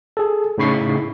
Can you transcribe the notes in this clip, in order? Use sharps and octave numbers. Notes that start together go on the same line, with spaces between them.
G#4 A4
A2 C#3 D#4 B5 C#6 C7